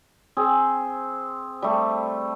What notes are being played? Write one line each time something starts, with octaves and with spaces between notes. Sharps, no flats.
C4 G#4
G3 A3